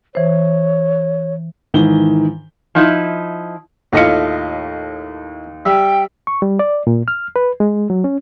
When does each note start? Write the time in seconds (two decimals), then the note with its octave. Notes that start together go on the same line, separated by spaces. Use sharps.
0.15 E3 C5 C#5
1.74 G#2 D#3 E3 G7
2.75 F3 D#4 E4
3.93 D#2 A2 A3 F4 D#5 C#7
5.65 G3 E5 G5
6.27 C#6
6.42 G3
6.59 D5
6.87 A#2
7.08 F6
7.36 B4
7.60 G#3
7.90 F#3
8.04 C#4